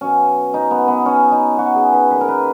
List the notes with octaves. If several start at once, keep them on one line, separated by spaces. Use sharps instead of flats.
B2 F#3 C#4
D#4
B3
B3
C#4
D#4
F#4
G#4
B4
A#2 F#3 B4
A#4
B4